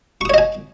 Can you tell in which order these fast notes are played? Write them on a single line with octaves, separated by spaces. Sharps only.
C#6 D#6 C#5 D#5 G#5